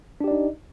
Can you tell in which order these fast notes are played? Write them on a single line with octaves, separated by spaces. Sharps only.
D4 G4 D5 D#4 D#5